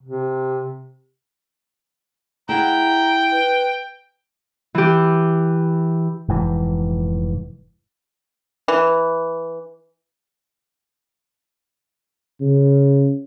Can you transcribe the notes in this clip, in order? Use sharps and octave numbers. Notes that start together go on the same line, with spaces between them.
C3
E4 G#4 F#5 G5 A#5
B4
E3 G4
F1 G#2 E3
E3
C#3